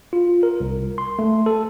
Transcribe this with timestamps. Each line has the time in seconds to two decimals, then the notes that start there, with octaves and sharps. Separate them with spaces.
0.13 F4
0.43 A#4
0.60 C2
0.98 C6
1.19 A3
1.46 A4